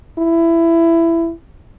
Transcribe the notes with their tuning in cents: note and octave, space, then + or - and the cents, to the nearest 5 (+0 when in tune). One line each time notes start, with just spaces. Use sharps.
E4 +15